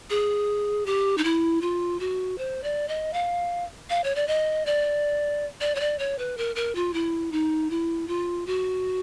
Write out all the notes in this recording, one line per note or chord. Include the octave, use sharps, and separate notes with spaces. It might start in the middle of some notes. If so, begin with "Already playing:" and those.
G#4
G4
D#4
E4
F4
F#4
C5
D5
D#5
F5
F5
C#5
D5
D#5
D5
D5
C#5
D5
C#5
B4
A#4
A#4
F4
E4
D#4
E4
F4
F#4